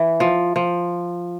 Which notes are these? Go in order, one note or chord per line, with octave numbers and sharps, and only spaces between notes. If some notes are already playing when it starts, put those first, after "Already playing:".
Already playing: E3
F3
F3